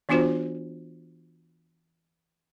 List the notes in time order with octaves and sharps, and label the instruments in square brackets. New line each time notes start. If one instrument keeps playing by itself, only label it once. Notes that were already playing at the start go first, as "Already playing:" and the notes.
[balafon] E3 B3 D4 F4 F#4 C5